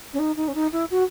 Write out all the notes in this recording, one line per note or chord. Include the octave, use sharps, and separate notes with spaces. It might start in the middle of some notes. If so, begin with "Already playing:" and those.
C#4
D#4
D#4
C#4
D#4
E4
F#4